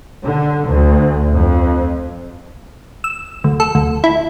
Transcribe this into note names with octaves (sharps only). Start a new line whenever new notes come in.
D3
D2
F2
E6
D2
A4
D2
E4